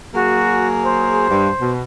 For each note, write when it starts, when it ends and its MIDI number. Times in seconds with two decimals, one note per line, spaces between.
0.14 1.28 54
0.14 1.28 58
0.14 0.68 66
0.14 1.28 68
0.84 1.71 72
1.29 1.49 43
1.60 1.82 47